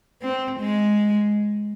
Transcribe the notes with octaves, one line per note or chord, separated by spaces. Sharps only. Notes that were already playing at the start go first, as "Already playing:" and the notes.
C4
G#3